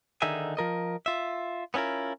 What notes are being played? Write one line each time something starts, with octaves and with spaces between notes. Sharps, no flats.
D3 D#3 D#4 G#4 E5 G#5
F3 A#4 D#5
F4 E5
B3 C#4 E4 F4 A#4